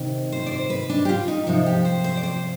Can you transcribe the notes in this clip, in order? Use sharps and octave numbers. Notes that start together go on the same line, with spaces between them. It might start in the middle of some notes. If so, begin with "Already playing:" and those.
Already playing: C3 D#3
C5
D5
C5
B4
D4
G4
F4
D#4
C3 F3 D#4
G4
C5
C5
D5
C5